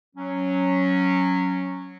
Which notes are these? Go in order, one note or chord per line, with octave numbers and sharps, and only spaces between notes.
F#3 C#4